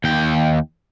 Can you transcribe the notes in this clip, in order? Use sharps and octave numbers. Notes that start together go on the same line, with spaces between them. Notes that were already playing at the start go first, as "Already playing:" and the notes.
D#2 G5